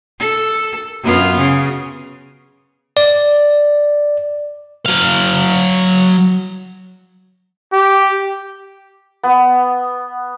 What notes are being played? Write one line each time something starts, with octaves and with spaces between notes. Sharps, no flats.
A4
F#2 B3 F4
C#3
D5
F#3 F5
G4
B3